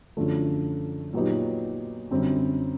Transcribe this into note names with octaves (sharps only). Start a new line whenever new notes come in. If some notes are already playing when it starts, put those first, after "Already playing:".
F#2 D3 F3 A3
A#2 F#3 B3 D#4 G4
F#2 D3 G3 C4